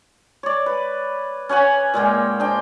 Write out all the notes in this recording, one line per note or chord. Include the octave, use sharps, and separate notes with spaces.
C#5 D5
B4
C#4 C#5 F#5 G#5
A#2 G#3 A#3 G5
D4 G#4 C5 G5